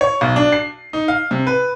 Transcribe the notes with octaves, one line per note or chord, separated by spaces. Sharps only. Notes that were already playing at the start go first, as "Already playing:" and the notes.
C#5
B1
D4
C7
D#4
F5
C3
B4